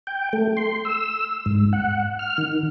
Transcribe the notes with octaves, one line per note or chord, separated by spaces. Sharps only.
G5
A3
C6
E6
G#2
F#5
F6
D#3